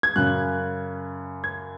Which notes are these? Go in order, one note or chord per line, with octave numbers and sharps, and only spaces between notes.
G#6
F#2 C#3 F#6
G#6